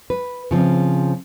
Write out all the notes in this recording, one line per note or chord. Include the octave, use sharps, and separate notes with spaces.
B4
C#3 F3 C4